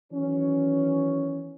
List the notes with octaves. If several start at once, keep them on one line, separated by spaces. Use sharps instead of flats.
D#3 E3 F#3 B3 C#4